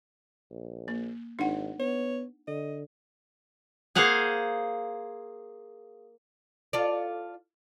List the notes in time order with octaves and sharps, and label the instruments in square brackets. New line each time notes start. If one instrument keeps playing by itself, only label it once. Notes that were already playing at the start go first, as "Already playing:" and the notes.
[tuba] A#1
[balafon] A#3
[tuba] G#1 [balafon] D4 D#4 F#5
[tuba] B3 [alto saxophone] C#5
[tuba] D3 [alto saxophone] D#5
[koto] A#3 G#4 C5 F5 F#5 G#5
[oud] F4 A4 D5